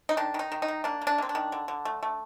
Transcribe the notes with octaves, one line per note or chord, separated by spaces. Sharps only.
D#4
D#3 D4
D#3 D#4
D#3
D#4
D#3
A#3 D4
A#3
D4
A#3 C4
D4
D#3
D3
D3
A3
A3